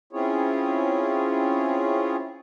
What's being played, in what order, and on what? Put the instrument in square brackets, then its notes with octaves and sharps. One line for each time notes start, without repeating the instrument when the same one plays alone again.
[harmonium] C4 C#4 E4 F4 G#4 C#5